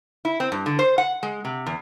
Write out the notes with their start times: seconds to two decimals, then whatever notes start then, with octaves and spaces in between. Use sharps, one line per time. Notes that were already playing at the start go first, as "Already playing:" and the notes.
0.25 E4
0.40 C4
0.52 G2
0.66 D3
0.79 C5
0.98 F#5
1.23 G#3
1.45 C3
1.66 E2